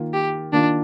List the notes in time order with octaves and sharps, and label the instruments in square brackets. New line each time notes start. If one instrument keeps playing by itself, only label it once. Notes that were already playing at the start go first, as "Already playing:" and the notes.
Already playing: [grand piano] D#3 A#3 F4
[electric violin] G4
[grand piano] D#3 A#3 F4 [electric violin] D4